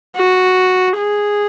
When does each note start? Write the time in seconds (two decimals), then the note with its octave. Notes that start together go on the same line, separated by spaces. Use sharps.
0.16 F#4
0.97 G#4